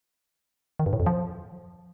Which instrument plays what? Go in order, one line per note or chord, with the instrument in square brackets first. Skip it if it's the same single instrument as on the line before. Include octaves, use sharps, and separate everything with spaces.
[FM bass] D#3
G2
A2
F2
F3